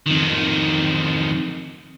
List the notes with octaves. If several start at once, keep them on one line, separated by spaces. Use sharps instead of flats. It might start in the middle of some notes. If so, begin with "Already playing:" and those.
F2 D#3